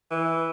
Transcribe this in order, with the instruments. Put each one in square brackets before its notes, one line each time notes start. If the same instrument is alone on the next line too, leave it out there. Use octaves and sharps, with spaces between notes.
[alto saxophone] E3